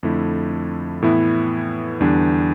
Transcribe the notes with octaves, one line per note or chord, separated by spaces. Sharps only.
F2 D3 A3 E4
A2 E3 B3 E4
E2 D3 G3 D4